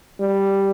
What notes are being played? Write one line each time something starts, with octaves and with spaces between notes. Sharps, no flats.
G3